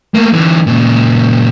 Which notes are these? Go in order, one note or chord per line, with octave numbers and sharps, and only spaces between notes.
A3 A#3
D3 E3
A#2 C#3